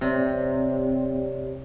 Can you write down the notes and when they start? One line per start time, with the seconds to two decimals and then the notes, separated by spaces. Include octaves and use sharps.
0.01 C3 C4 G4 C#5 D5